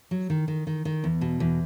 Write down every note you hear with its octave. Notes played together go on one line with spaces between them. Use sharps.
F#3
D#3
D#3
D#3
D#3
E2
B2
E2